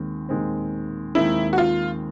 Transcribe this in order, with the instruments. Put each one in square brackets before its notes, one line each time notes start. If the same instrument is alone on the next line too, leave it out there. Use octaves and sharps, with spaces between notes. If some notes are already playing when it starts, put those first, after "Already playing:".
Already playing: [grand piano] D#2 D#3 G#3 C4
D#2 D#3 G#3 C4
[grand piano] D#2 D#3 G#3 C4 [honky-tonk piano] E4
[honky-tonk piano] F#4
F4